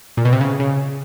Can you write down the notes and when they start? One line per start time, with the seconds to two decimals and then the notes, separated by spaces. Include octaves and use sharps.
0.17 A#2
0.25 B2
0.33 C3
0.41 C#3
0.60 C#3